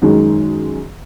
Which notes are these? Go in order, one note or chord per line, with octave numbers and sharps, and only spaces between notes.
F#2 D#3 G#3